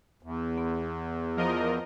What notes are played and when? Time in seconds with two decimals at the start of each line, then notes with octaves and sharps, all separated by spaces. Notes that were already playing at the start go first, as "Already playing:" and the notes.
0.23 E2
0.58 B3
1.37 F3 A#4 D#5